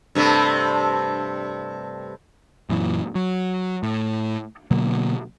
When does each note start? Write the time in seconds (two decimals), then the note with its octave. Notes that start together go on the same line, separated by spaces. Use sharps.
0.15 G2 C3 A3
2.69 F#2 A#2 E3
3.15 F#3
3.83 A2
4.71 B2 D3 F#3 A#3